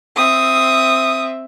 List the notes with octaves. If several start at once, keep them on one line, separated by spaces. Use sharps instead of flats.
C4 E5 D#6